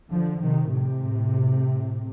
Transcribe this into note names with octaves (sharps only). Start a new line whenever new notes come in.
D3 F3
C3 D#3
A2 C3